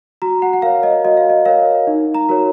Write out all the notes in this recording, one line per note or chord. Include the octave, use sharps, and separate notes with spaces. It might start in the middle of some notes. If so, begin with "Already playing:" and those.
F#4 A#5
F#5
F#5
A#4 C#5 F5
D#5
F#4 D#5
F5
D#5
A#4 C#5 F5
D#4
A#5
F#4 A#4 C#5